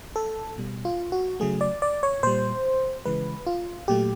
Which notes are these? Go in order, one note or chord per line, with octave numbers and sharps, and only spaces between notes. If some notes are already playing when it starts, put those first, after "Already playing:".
A4
B2 G3
F4
F#4
C#3 F#3 A3 G#4
D5
D5
C#5
A#2 G3 C5
C#3 E3 G#3 B4
F4
A#2 F#3 A3 G4